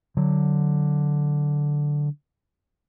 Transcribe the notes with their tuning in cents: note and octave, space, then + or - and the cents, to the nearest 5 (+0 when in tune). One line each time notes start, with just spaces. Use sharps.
D3 +0 F#3 +0